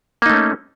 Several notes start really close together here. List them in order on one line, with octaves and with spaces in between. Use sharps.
A#3 D#4 A3 C#4